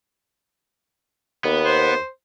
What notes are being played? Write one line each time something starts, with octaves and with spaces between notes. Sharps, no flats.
D#2 B3
C5